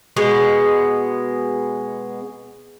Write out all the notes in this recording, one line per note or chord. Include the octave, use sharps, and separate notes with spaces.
B2 G#3 B3